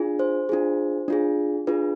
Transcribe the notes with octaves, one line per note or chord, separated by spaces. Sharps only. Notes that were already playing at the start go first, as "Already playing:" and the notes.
Already playing: D4 F4 G#4
C5
D4 F4 G#4
D4 F4 G#4
D4 F4 G#4 B4